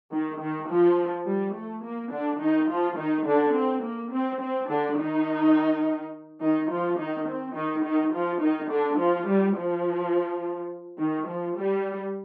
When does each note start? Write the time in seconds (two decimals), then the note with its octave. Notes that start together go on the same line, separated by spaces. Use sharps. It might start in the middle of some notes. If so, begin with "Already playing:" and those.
0.12 D#3
0.40 D#3
0.69 F3
1.27 G3
1.55 A3
1.84 A#3
2.11 D3 D4
2.40 D#3 D#4
2.69 F3 F4
2.98 D#3 D#4
3.26 D3 D4
3.55 C4
3.83 A#3
4.12 C4
4.41 C4
4.69 D3 D4
4.98 D#3 D#4
6.41 D#3 D#4
6.70 F3 F4
6.98 D#3 D#4
7.28 C4
7.55 D#3 D#4
7.84 D#3 D#4
8.12 F3 F4
8.41 D#3 D#4
8.70 D3 D4
8.98 F3 F4
9.27 G3
9.56 F3
10.98 D#3
11.27 F3
11.57 G3